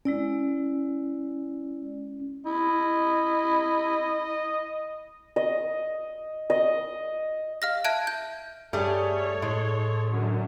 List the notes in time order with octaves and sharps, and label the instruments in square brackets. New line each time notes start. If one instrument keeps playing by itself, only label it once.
[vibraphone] G#3 E4 D5 [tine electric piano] C#4
[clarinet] E4 [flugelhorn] D#5
[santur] D#5
D#5
[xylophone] F5 F6 A#6
E5 A5 F#6 G#6 D7
G6
[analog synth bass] G2 [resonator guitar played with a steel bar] G3 A3 G#4 [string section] A4 C#5
[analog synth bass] A2 [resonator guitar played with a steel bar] G#3
[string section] F#2 D3